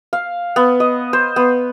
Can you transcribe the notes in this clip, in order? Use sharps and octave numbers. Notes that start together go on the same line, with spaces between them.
F5
B3
D#5
C5
B3